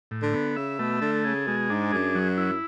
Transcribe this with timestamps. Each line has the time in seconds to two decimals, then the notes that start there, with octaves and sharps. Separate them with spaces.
0.11 A2
0.22 D3
0.33 B3
0.56 C#3 E5
0.79 B2 A3
1.01 D3 A4
1.24 C#3 G#4
1.47 B2 G#3
1.70 G#2 D4
1.92 F#2 G#4
2.15 F#3
2.37 E4